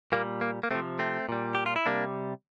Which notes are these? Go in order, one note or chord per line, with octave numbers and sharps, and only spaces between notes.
A#2 G3 A#3
A#3
A#3
C3 F3 A3 C4
A3 C4
A#2 G3
G4
F4
E4
C3 G3 A#3 D4